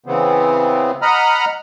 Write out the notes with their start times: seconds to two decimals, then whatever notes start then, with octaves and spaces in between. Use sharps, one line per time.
0.06 C#3 E3 B3 C4
1.02 D#5 F#5 A#5 B5 D#6 F6